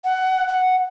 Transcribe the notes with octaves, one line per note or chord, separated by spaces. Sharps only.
F#5
F#5